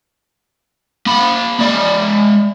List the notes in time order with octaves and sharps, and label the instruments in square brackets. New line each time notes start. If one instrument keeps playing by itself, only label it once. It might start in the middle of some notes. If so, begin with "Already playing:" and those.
[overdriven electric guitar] A#3 B5
G#3 D5